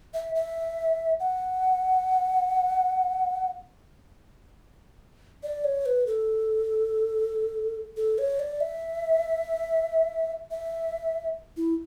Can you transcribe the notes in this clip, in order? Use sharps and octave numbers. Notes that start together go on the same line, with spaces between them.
E5
E5
F#5
D5
C#5
B4
A4
A4
C#5
D5
E5
E5
E4